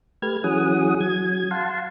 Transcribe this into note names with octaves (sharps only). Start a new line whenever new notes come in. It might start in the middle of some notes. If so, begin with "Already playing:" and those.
A3 G4 B4 F6 G#6
E3 F#3 C#4 G#4 F#5 D#6
F#3 G#6
F5 F#5 A5 C6